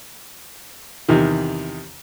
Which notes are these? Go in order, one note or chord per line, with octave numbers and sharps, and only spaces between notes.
E2 C3 D#3